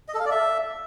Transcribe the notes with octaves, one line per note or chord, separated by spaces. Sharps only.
D#5
A4
F5
D5
E5